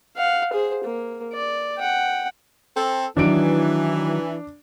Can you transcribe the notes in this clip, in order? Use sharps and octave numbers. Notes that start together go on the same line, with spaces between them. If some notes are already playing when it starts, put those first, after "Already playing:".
F5 F#5
G#4 C5
A#3
D5
F#5 G5
C4 A4
D#3 E3 F#3 D4 D#4 D7